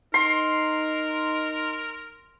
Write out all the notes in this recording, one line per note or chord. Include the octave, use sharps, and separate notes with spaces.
D#4 A#4 C6